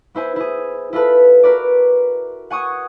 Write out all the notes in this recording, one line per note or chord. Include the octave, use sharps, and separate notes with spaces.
B3 E4 C5 G#5
E4 G#4
E4 F4 A4 B4 A5
F#4 A#4 B4 D5
F#5 G#5 C#6 D#6